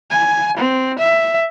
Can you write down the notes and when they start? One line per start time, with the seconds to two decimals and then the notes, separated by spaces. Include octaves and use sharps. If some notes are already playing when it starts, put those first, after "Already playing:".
0.11 G#5
0.57 C4
0.99 E5